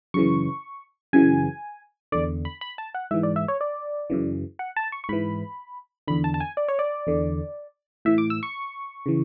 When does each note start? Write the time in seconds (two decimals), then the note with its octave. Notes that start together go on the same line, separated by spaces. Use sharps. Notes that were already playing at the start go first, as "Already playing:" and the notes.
0.14 F#2 C#3 E3 C#6
1.13 F#2 C#3 E3 G#5
2.12 E2 D3 D5
2.45 B5
2.61 B5
2.78 A5
2.94 F#5
3.11 G#2 E3 E5
3.23 D5
3.36 E5
3.48 C#5
3.61 D5
4.10 F#2 C#3 E3
4.59 F#5
4.76 A5
4.92 C#6
5.04 C#6
5.09 G#2 E3 B5
6.08 E2 D3 B5
6.24 A5
6.34 A5
6.40 G#5
6.57 D5
6.68 C#5
6.79 D5
7.07 E2 D3
8.05 A2 E3 E5
8.18 D6
8.30 E6
8.43 C#6
9.06 C#3 E3